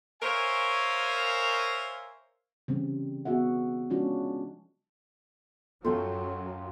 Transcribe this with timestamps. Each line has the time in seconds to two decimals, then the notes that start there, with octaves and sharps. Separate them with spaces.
0.22 A#4 C5 C#5 E5 F5 G#5
2.68 C#3 E3 G3 C4
3.25 B3 F#4 G#4 E5 F#5
3.90 F3 G#3 C#4 D4 F4 F#4
5.85 F#2 F#3 A3 F4 G5 A5